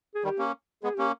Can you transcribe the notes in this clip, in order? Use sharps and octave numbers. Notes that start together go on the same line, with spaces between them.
G#4
D#3 G3 G4
A#3 C#4
G#3 B3 G#4
A#3 C#4 G4